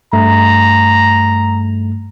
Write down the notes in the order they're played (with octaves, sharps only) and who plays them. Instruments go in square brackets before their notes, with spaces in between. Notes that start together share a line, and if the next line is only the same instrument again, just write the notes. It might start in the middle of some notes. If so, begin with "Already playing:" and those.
[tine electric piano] G2 A3 [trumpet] A#5